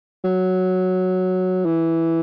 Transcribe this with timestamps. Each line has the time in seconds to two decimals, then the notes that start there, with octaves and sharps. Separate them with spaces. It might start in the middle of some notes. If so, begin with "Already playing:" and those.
0.24 F#3
1.65 E3